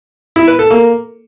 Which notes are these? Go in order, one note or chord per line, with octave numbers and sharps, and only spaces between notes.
E4
B4
A4
A#3